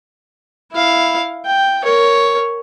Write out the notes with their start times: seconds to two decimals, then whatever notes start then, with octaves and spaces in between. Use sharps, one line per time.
0.72 E4 F5
1.46 G5
1.84 A#4 C#5